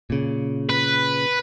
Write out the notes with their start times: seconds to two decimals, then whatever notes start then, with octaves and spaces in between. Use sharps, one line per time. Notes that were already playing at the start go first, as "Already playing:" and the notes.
0.10 A#2 C#3
0.70 B4